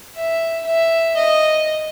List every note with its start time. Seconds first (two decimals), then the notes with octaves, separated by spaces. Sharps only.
0.16 E5
0.66 E5
1.16 D#5